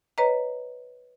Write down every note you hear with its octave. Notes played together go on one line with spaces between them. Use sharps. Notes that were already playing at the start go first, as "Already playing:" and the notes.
B4 C#5 D#5 A#5